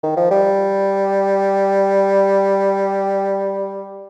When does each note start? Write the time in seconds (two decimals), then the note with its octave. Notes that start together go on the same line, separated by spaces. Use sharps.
0.03 D#3
0.17 F3
0.31 G3